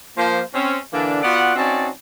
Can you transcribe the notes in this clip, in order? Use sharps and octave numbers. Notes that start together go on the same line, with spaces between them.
F3 A#3 C5
C4 C#4
D3 E3 A#3 D4
B3 F4 F#4 D5 F#5
C4 C#4 D#4 F#4 D5 A5